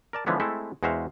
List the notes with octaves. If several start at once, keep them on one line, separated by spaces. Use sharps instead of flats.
A#4 D5 A5
D3 E3 F3 G#3 B3 C#4
G#3 A3 C4 E4 A4 E5
E2 G#3 F#4 C5 E5 F5